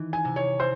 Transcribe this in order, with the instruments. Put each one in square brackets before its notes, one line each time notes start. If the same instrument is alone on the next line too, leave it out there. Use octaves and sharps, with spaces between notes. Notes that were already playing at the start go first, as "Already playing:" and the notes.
Already playing: [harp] D#3 E3
[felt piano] G#5
[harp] C3
[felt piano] C#5
[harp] C4 [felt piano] C5